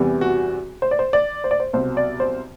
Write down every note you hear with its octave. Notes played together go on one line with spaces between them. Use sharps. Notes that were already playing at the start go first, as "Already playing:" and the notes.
Already playing: E2 C3 E3 G3
F#4
C5
D5
C5
D5
C5
D5
C5
C2 B2 F#3 C5
D5
C5